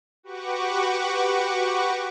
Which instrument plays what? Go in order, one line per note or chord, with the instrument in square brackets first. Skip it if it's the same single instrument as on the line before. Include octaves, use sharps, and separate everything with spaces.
[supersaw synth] F#4 G4 B4 F#5 C#6 D6